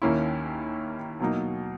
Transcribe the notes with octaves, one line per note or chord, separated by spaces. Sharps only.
D#2 D#3 A#3 C#4 E4
B2 F#3 A#3 D#4